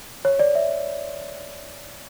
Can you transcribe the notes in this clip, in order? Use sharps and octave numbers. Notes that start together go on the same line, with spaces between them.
C#5
D5
E5